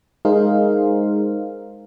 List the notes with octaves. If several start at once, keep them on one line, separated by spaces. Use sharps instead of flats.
G#3 D#4 G#4 A#4 C5 F5